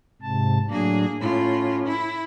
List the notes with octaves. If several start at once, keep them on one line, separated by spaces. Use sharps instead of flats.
G#2 C3 A5
A2 F#3 A#3 D4 G#4
A2 C#4 F4
E4